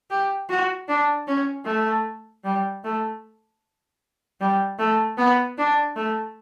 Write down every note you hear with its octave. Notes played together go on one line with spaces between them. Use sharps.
G4
F#4
D4
C#4
A3
G3
A3
G3
A3
B3
D4
A3